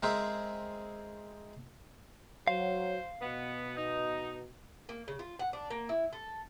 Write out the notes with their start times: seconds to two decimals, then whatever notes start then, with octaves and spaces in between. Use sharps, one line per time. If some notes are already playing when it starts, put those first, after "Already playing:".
0.03 G#3 C4 G#4 A#4 C5 E5
2.48 F#3 C5 F5
3.22 B2 B3
3.77 D#4
4.89 A#3
5.08 C#3
5.19 F4
5.39 F#5
5.53 D4
5.70 A#3
5.89 E4
6.13 A4